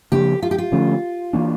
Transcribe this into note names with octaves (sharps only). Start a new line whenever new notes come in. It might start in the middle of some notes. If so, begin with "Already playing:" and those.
C#3 F3 A#3 D4 G4
F4
G4
F4
D3 F3 A3 C#4
E3 A#3 D4